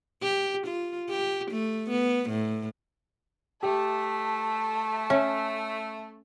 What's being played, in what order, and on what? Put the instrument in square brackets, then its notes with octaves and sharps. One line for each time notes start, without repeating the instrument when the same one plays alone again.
[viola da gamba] G4
F4
G4
A3
B3
A2
[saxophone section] A3 [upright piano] G4 [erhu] A5
[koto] C#4 [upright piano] E5